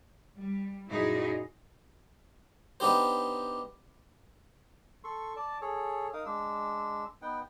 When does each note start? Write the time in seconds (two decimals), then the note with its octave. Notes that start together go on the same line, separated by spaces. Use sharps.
0.38 G3
0.89 F#2 A#2 D#4 E4 F#4 G#4
2.80 B3 D4 D#4 G4 C5
5.04 A4 C6 C#6
5.36 D5 A5
5.62 G#4 A4 C#5
6.13 D#4 A#4 F5 D#6
6.26 G#3 D4 E6
7.22 B3 D#4 F#5 G5